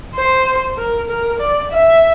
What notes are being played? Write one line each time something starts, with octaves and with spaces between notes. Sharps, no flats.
C5
A#4
A#4
D5
E5